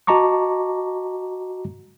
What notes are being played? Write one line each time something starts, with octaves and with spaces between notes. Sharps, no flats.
F#4 D#5 A5 A#5 C#6 D6